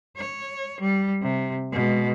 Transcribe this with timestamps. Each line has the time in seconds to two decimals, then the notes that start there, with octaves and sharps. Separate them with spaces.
0.17 C#5
0.81 G3
1.22 C3
1.72 B2 G#3